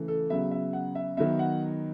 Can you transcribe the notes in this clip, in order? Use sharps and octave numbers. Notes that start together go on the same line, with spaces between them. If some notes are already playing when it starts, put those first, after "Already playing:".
Already playing: C#3 E3 A3
A4
C#3 F#3 B3 E5
E5
F#5
E5
D#3 F#3 B3 E5
F#5